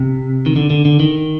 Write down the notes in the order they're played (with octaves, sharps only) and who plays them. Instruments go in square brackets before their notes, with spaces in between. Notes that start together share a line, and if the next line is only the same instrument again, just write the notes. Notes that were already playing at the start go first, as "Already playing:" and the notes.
Already playing: [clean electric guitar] C3
D#3
D3
D3
D3
D#3